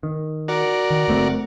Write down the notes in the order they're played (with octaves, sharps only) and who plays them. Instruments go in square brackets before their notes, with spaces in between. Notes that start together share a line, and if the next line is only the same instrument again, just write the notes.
[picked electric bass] D#3
[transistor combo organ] F#4 A#4 D5
[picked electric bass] D#3
F#1 A3 C4